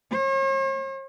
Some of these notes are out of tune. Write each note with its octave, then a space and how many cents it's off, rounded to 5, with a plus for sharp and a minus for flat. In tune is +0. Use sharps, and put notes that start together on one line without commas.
C#5 -45